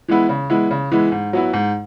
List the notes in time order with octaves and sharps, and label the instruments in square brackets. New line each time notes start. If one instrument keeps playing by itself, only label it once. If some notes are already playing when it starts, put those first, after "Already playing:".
[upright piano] E3 G#3 B3 E4
C#3
E3 G#3 B3 E4
C#3
E3 G#3 B3 E4
G#2
F#3 B3 E4
G#2